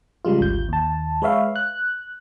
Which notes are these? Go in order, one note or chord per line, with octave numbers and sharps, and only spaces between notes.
C#3 G3 G#3 F4
G#1 D2 G6
D#2 A5
G#3 B4 C#5 E5 F5
F#6